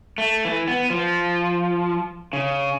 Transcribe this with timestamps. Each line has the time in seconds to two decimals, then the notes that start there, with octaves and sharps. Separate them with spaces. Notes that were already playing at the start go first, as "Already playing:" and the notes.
0.18 A3
0.45 E3
0.68 B3
0.90 F3
2.33 C#3